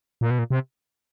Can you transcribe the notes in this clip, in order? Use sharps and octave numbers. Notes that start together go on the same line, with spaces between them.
A#2
B2
A#2
C3